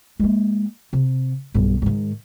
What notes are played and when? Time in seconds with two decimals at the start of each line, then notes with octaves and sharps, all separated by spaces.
0.20 G#3 A#3
0.93 C3
1.54 B1 G2
1.82 G#2 D#3